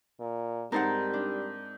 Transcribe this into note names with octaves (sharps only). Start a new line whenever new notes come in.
A#2
G#2 G3 C4 D#4 A#4 F#5 A5 C6
D4